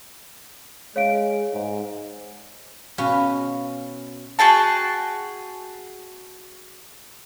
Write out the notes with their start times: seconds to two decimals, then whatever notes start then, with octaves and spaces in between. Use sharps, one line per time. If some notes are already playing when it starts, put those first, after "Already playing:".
0.96 G#3 C#5 F5 D7
1.54 G#2
2.98 B2 C#4 B4 F5 G#5
4.39 F#4 G#4 G5 A5